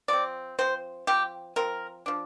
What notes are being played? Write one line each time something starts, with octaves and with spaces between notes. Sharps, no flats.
F3 C4 D5
F3 C4 C5
F3 C4 G4
F3 C4 A#4
F3 D4